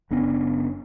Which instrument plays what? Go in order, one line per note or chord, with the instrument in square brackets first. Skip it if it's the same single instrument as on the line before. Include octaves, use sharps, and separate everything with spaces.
[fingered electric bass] F#1 B3 C#4 D4